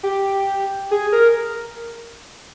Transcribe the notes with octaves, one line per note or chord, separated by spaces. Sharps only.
G4
G#4
A#4